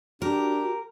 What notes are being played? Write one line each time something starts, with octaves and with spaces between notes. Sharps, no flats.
D4 F#4 G4 A#4